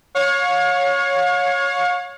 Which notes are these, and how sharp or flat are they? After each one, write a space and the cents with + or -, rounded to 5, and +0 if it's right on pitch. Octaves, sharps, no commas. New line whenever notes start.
C#5 +0 F5 +40